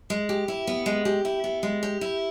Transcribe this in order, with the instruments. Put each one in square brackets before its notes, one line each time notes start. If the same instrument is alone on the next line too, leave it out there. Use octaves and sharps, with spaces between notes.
[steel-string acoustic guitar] G#3
G4
E4
B3
G#3
G4
E4
B3
G#3
G4
E4